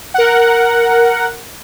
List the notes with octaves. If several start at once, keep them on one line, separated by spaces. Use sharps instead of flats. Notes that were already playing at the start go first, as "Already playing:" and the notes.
A#4 F#5